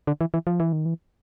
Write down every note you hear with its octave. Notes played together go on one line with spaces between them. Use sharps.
D3
E3
E3
F3
E3
D#3
E3